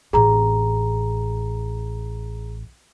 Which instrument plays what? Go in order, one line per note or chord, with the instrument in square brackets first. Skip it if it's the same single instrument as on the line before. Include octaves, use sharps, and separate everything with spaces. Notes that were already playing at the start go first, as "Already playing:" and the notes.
[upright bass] A1 C4 [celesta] G#4 A#5